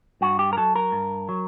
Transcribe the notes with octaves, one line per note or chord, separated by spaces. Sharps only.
G2 F#4
G4
A#4
F#3 A4
A#4
G2
F#3